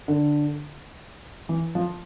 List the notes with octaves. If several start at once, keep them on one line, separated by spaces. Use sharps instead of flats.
D3
E3
F3